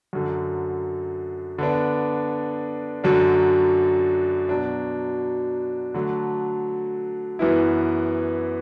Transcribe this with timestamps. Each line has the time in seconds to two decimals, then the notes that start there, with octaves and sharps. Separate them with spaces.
0.13 F#2 D3 F#3
1.58 D3 B3 D4
3.04 F#2 D3 F#3 D4
4.49 B2 F#3 D4
5.94 D3 F#3 A3
7.39 F#2 E3 B3 E4